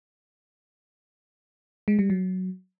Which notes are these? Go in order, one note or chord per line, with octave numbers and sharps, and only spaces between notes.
G#3
G3
F#3